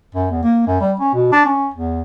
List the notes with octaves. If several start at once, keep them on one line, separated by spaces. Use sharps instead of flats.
F#2
E2
A#3
F#2
G3
C#4
B2
D4
C#4
E2